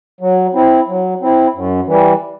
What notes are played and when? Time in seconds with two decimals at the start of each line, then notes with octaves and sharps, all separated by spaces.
0.20 F#3
0.54 C4 E4
0.87 F#3
1.21 C4 E4
1.54 F#2
1.87 E3 G3